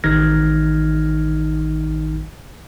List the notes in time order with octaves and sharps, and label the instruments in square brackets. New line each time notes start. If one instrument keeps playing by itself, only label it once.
[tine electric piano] A1 D#3 D#4 F6 G#6 A#6